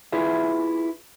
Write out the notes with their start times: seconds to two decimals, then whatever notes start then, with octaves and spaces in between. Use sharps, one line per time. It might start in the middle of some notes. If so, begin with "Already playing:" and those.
0.12 E4 F4 G#4 B4 E5